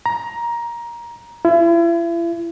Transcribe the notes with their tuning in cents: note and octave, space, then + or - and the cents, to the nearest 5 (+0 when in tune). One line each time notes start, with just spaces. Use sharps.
A#5 +15
E4 +40